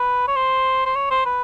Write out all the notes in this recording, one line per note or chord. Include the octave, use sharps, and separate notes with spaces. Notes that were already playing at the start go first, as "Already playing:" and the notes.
Already playing: B4
C#5
C5
C5
C#5
C5
B4